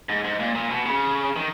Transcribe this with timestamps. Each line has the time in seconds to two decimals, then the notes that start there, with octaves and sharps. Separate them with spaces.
0.09 G#2
0.24 G#2
0.40 A#2
0.55 A#2
0.71 B2
0.86 C#3
1.36 D#3